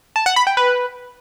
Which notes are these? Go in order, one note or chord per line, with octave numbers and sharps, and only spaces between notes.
A5
F#5
B5
G5
B4